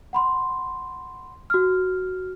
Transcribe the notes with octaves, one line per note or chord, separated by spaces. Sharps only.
F#5 B5 C6
F#4 F6